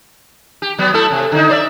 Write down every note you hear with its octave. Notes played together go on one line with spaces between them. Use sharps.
G4
F#3 B3
A3 E4 A4
C3
D3 D#4
C5 D5 E5